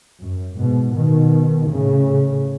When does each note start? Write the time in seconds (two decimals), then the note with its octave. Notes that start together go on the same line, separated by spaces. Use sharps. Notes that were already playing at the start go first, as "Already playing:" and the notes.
0.21 F#2
0.58 G#2 B2
0.95 B2 D#3
1.69 A2 C#3